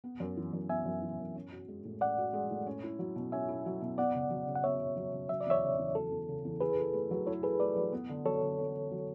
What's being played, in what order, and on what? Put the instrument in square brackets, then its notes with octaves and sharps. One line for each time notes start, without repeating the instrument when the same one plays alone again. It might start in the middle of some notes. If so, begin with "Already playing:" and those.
[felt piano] B3
F#2
E3
F#2
[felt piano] B3 [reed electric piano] E5 G#5
[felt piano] F#2
E3
F#2
C#4
F#4
G#3
A2
[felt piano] C#4 [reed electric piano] D5 F#5
[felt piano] F#4
G#3
A2
C#4
E4
F#3
B2
[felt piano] C#4 [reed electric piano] E5 G#5
[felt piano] E4
F#3
B2
[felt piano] B3 [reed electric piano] D5 F#5
[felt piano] C#3
F#3
C#3
[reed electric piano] F#5
[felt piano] B3 [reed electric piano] C#5 E5
[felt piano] C#3
F#3
C#3
[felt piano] F#3 [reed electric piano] E5
[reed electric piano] D5
[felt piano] E2 [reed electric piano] C#5 E5
[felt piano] C#3
E2
[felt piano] F#3 [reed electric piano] A4
[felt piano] E2
C#3
E2
[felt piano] E4 [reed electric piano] G#4 B4
[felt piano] A4
A3
F#3
[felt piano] E4 [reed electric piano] A4 C#5
[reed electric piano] G#4 B4 [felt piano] A4
[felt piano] A3 [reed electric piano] B4 D5
[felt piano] F#3
B3
D3
[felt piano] F#3 [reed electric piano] A4 C#5
[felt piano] D3
B3
D3
F#3